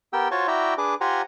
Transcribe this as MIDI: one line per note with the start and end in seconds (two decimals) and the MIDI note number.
0.13 0.28 59
0.13 0.28 67
0.13 0.28 70
0.13 0.28 79
0.13 0.28 88
0.31 0.47 65
0.31 0.47 66
0.31 0.47 72
0.31 0.47 73
0.31 0.47 81
0.31 0.47 85
0.48 0.74 64
0.48 0.74 66
0.48 0.74 74
0.48 0.74 76
0.48 0.74 79
0.48 0.74 82
0.78 0.95 62
0.78 0.95 68
0.78 0.95 71
0.78 0.95 86
1.01 1.22 65
1.01 1.22 67
1.01 1.22 72
1.01 1.22 78
1.01 1.22 80
1.01 1.22 82